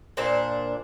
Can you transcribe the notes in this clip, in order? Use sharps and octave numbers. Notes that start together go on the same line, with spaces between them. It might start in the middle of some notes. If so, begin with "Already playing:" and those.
A#2 D4 C5